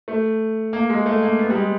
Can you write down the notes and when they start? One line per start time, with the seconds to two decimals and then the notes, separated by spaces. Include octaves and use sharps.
0.08 A3
0.73 A#3
0.90 G#3
1.06 A3
1.23 A#3
1.39 B3
1.50 G3
1.55 G#3